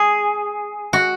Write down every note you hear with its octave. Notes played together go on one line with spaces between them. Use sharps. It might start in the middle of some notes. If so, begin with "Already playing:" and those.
Already playing: G#4
F#4